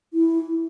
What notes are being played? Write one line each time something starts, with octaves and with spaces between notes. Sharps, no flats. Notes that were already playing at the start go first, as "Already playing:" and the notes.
E4